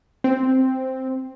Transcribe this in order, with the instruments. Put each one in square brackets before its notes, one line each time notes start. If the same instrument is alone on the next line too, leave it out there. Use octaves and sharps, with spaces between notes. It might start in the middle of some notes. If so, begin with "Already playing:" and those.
[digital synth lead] C4